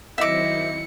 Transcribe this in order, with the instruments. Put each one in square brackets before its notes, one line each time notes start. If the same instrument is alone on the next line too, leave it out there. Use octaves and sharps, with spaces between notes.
[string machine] D#3 F#3 C4 [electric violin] E4 C#7 [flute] D#5 [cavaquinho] E5 D6